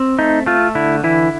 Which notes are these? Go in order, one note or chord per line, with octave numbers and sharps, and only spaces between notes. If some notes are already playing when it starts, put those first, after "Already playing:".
Already playing: C4
A3 D#4
A3 F4
D3 E4
E3 E4